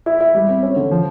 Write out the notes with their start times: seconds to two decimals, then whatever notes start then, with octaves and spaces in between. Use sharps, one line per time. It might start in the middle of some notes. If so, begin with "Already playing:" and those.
0.06 E4
0.21 E4
0.34 G3
0.49 C4
0.63 C#4
0.76 D3
0.91 F3